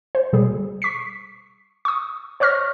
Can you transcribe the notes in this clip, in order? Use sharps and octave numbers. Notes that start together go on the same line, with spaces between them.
C5
B2 G3 G#4
C#6 B6 C7
C#6 D#6
C5 C#5 C#6 F6 A#6